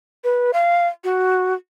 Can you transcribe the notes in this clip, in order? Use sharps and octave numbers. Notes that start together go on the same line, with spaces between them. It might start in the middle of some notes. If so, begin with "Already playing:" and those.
B4
F5
F#4